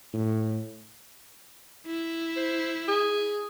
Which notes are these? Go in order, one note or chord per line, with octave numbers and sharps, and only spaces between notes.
A2
E4
C5
G#4